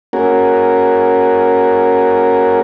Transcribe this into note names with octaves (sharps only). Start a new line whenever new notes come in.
A#3 C#4 F#4 G#4 A#4